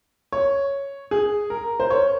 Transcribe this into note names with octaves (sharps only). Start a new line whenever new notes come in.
C#5
G#4
A#4
C5
C#5